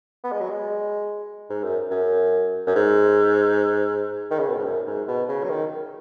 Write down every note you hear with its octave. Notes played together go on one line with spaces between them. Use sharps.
B3
G#3
F#3
G#3
G#2
F#2
F#2
F#2
G#2
D#3
C#3
B2
G#2
F#2
G#2
B2
C#3
F#3
D#3